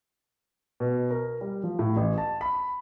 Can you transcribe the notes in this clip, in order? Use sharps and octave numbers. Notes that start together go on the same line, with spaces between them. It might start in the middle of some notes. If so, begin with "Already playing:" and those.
B2
A#4
G3
F3
A2
A1
A5
B5